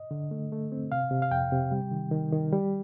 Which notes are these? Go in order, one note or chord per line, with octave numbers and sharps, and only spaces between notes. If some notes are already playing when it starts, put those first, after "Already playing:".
Already playing: D#5
D3
A3
A3
C4
C3 F5
C3
F5
F2 G5
C3
G3
D#3
D#3
D#3
G3